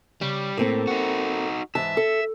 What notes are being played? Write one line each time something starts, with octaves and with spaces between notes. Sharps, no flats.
C#3 G3
A2 A#3 C4 A4
D#4 F#4
G#2 E3 E5 A5
A4